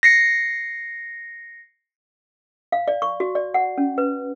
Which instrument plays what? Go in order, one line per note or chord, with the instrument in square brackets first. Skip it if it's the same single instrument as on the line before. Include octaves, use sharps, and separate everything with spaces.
[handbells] A#6 C7 C#7
[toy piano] F5
D5
C#6
F#4
D5
F#5
C#4
B4